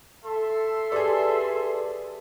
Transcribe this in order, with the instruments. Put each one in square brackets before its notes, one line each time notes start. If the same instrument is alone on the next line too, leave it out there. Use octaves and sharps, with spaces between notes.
[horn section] A4 E5 C6
[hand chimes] G4 B4 [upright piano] G#4 D5